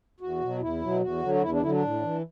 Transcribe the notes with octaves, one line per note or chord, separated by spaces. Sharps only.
E2 F#4
B2 F#3
E2 E4
B2 F#3
E2 F#4
D3 F#3
F#4
E2 E4
D4
D3 F#3 E4
D4
A2
E3